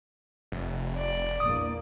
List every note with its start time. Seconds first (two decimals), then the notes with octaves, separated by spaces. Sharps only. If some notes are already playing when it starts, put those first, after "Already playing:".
0.52 F1
0.99 D5
1.40 A#1 E2 A#3 D#6